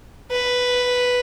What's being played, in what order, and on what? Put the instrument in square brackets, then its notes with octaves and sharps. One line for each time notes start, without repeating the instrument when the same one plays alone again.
[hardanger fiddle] B4